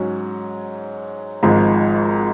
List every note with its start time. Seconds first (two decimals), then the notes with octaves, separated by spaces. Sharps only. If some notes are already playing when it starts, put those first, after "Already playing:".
Already playing: G#2 F#3 C#4
1.43 G#1 G#2 F3 G#3